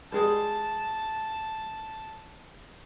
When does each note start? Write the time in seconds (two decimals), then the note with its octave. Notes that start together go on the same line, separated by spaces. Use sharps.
0.12 G3 G#3 G#4 A5